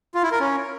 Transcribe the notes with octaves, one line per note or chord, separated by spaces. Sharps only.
F4
E4
A#4
C#4